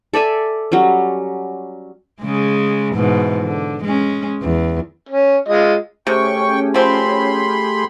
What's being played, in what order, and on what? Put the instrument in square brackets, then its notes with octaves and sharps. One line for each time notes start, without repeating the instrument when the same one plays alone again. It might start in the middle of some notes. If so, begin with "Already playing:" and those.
[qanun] A4 D5 E5 G#5
F#3 G3 C#4
[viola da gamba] C#3 G#3
G#2 B2 E3
D3
G#3 C#4
E2
[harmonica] C#4
G#3 F4 D#5
[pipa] C3 [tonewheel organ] A3 G4 G#4 [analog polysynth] C#4 [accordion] G5 C#6
[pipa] F3 C4 [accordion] B5 C6